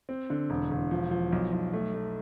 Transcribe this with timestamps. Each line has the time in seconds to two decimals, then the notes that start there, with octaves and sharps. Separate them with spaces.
0.09 C4
0.30 D3
0.50 E1
0.71 E1
0.91 F3
1.11 F3
1.32 B1
1.52 B1
1.73 A3
1.94 A3